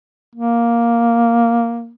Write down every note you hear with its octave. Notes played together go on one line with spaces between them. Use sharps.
A#3